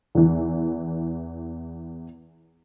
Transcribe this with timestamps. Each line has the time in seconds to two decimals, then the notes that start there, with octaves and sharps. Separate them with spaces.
0.15 E2 E3